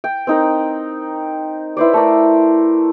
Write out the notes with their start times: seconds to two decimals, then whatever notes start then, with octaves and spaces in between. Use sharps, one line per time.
0.04 G5
0.27 C4 D#4 A#4
1.77 E4 B4 C5 D5
1.94 A3 A#4 D5